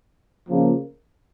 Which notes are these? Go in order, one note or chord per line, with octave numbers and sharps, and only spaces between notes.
C#3 F3 A#3